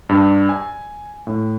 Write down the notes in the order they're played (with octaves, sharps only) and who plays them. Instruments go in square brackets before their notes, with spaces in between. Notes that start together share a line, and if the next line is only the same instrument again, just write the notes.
[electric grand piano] G2
G#5
A2